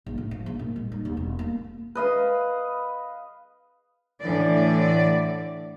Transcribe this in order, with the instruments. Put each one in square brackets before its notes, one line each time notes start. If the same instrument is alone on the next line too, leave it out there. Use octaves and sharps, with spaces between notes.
[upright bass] A#1
A2
F3
A#1
A#2
G#3
D#4
D#2
E1
A#3
[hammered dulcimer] B4 D#5 F5
[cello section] A2 D3 E3 D5